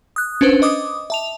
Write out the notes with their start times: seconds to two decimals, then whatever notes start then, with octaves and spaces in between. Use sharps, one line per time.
0.16 D#6 F#6
0.41 C#4 D4 B4 C5
0.62 D#5 D6 D#6
1.10 E5 A5 F7